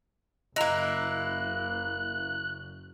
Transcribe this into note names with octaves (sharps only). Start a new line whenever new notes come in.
F#1 A#3 E4 D#5 A#5 F#6